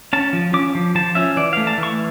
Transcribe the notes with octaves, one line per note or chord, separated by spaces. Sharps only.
C#4 A5
F3
C#4 D6
F3
F3 A5
C#4 E5
E3 D5
A3 F5
A5
E3
C#6